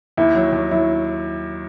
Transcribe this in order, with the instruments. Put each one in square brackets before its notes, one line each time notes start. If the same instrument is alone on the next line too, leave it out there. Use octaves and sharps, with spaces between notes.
[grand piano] D#2 [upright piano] E4
[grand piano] F#3
D#2
[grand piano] F#3 [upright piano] E4